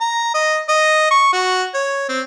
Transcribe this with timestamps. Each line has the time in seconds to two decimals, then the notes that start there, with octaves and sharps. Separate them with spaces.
0.01 A#5
0.34 D#5
0.69 D#5
1.11 C#6
1.33 F#4
1.74 C#5
2.09 C4